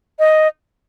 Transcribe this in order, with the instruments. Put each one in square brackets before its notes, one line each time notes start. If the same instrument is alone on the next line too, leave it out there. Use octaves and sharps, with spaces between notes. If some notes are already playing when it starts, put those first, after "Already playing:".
[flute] D#5